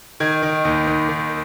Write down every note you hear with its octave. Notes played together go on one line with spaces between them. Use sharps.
D#3 G#6
D#3
D#2
D#2
D#3